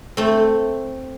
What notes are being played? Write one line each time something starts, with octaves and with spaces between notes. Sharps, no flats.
A3 C4